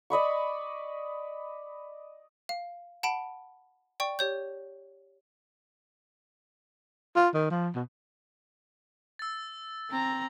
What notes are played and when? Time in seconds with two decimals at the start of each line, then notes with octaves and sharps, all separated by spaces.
0.10 D5 D#5 B5 C#6
2.49 F5
3.03 F#5 A5 B5 D7
4.00 D5 G5 C#6
4.19 G4 C#5 G6
7.16 F4
7.34 D#3
7.50 F3
7.75 B2
9.19 E6 A6
9.90 C4 A#5